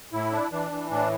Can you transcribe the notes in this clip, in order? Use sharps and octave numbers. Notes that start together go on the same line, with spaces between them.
A2 E4
D4
E3 D4
E3
A2 D4